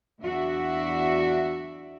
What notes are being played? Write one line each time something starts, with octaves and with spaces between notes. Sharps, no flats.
E2 D4 F#4 E5